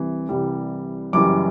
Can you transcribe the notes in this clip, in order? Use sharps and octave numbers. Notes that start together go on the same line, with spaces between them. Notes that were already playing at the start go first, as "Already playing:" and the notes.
Already playing: C2 C3 E3
C2 C3 E3 G3
F#1 F#2 E3 G3 D6